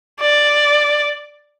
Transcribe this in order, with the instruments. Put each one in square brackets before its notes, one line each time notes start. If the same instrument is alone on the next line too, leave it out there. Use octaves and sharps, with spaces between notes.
[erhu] D5